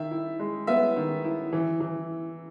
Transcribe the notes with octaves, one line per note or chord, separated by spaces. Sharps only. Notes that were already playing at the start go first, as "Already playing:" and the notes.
Already playing: D#3 E5
E4
G#3
B3 E5
D#3
E4
E3
E3